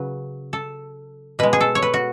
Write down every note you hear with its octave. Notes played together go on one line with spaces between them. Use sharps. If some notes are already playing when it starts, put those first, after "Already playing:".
Already playing: C#3 F#3 B4
A4
B2 G#3 B4
G#4
A4
C#5
B4
F#4